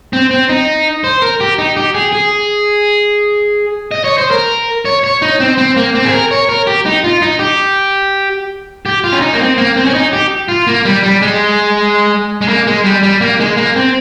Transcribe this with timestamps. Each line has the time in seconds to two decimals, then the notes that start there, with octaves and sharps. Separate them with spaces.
0.13 C4
0.31 C4
0.49 D#4
1.04 C5
1.22 A#4
1.40 G4
1.58 D#4
1.77 G4
1.94 G#4
2.13 G#4
3.91 D#5
4.04 C#5
4.18 C5
4.31 A#4
4.85 C#5
5.04 C#5
5.22 D#4
5.40 C4
5.58 C4
5.76 A#3
5.95 C4
6.05 G#4
6.12 A#4
6.31 C#5
6.49 A#4
6.67 G4
6.86 D#4
7.04 F4
7.22 D#4
7.39 G4
8.86 G4
9.04 F4
9.12 C#4
9.21 D#4
9.33 A#3
9.40 C4
9.58 A#3
9.76 C4
9.86 C#4
9.94 D#4
10.13 G4
10.48 F4
10.67 A#3
10.85 G3
11.03 G3
11.22 G#3
12.41 G#3
12.48 A#3
12.67 G#3
12.84 G3
13.03 G3
13.21 A#3
13.40 G#3
13.57 A#3
13.76 C4